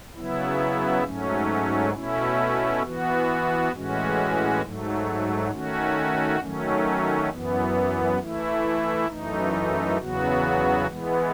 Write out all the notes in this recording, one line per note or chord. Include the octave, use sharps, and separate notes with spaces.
C#3 F#3 B3 E4
G#2 F#3 A3 C#4
B2 A3 C#4 E4
E3 B3 F#4
A2 E3 G#3 C#4 F#4
G#2 F#3 A3
D#3 A3 C#4 F#4
D#3 F#3 A3 C#4
F#2 E3 B3
E3 A3 E4
F#2 E3 A3 D#4
E2 C#3 F#3 B3 F#4
E3 G#3 B3